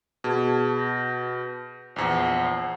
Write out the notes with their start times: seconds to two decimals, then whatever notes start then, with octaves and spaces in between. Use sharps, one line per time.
0.24 B2 G#4 A5 G#6
0.78 G6 A#6
1.96 A#1 E2 C5 F#5